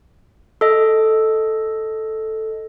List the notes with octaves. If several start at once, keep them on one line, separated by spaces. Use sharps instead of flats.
A4 D#5